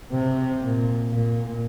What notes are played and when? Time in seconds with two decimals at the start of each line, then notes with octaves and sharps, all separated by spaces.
0.11 C3
0.60 A#2
1.09 A#2